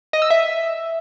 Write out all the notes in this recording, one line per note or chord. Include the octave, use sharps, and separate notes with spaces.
D#5
E6
E5